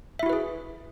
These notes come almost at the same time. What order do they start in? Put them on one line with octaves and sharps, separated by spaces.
E5 E4 F#4 B4 G#4